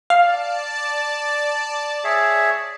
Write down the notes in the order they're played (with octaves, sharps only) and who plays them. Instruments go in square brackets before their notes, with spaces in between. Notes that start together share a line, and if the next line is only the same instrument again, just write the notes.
[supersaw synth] D5 A5 [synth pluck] F5
[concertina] G#4 C#5 E5